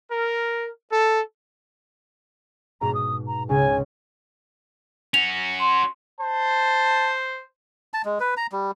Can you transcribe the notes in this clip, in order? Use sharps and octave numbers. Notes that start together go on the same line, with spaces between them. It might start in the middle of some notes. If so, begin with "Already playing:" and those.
A#4
A4
G#2 B2 A#5
D#6
A#5
C#2 C#3 G#5
C#4 F#4 F7
C6
C5 A5
A5
G#3
B4
A#5
G3